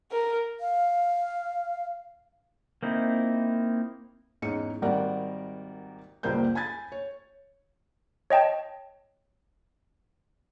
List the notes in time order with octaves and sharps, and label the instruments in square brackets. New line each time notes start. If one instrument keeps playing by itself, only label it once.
[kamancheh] A#4
[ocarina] F5
[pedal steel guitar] A#3 C4 D#4 E4
[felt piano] E2 G#2 C#4 D#4 C#7
G#1 G3 A#4 D5 F#5
F#1 C#2 G3 A#3 C5 G6
G#5 B5 G#6 A6
C#5
[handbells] C#5 D#5 G5 A5